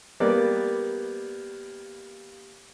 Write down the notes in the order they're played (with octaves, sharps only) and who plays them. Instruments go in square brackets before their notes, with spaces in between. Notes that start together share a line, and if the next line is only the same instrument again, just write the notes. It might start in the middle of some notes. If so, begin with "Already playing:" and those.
[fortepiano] G3 A#3 B3 D5